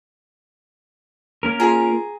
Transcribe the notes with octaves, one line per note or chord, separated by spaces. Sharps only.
A#3 C#4 A#4
F4 G#4 G#5 A#5